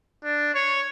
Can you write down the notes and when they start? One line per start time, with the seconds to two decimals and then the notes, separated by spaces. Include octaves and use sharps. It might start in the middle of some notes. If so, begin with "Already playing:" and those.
0.24 D4
0.54 C#5